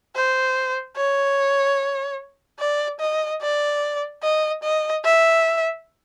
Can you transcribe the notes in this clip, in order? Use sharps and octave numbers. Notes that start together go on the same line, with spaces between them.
C5
C#5
D5
D#5
D5
D#5
D#5
E5